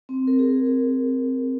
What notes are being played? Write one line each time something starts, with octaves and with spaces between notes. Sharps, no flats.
C4
A#4
G#4
A#4